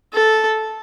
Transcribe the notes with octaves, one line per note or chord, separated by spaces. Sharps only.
A4